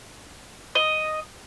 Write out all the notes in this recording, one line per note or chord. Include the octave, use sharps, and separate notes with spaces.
D#5